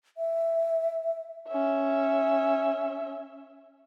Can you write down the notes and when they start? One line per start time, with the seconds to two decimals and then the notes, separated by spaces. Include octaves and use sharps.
0.18 E5
1.48 C#4 E5